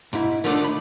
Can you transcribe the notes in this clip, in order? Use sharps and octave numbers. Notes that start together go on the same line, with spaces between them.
G#2 E4
D3 D#3 F3 A3 C4 D4
B5